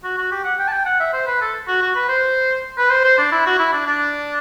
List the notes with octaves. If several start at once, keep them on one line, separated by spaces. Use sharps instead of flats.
F#4
F#4
G4
F#5
G5
A5
G5
F#5
E5
C5
B4
A4
F#4
F#4
B4
C5
B4
C5
C5
D4
E4
F#4
E4
D4
D4